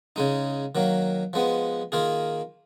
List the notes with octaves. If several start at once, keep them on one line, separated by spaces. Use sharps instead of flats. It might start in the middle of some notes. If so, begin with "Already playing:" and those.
C#3 G#3 D#4
D#3 F#3 A#3
F3 G#3 B3
D#3 A#3 F4 G#4